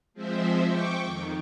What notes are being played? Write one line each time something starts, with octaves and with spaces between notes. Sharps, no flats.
F3 G#3 C4 C5 E5
G5 C#6 D6
F2 D#3